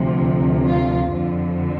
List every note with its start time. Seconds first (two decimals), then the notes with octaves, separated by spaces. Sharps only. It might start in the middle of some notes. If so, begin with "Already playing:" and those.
Already playing: D2 C3 F3
0.67 F4
1.13 F2 D3 F3